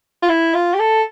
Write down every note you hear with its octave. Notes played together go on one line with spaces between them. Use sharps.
F4
E4
F4
G4
A4